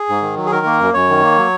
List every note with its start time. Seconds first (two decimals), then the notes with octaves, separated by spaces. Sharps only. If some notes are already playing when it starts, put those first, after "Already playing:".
Already playing: G#4
0.09 G#2
0.22 D#3
0.36 F#3
0.46 G#4
0.51 D#3 A#4
0.66 A#3
0.80 F#2
0.94 F#2 C#5
1.09 D#3
1.23 A#3
1.38 F#3